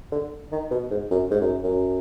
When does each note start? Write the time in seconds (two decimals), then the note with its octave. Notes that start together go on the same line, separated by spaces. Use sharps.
0.12 D3
0.52 D#3
0.71 B2
0.91 G#2
1.11 F#2
1.31 G#2
1.41 F#2
1.64 F#2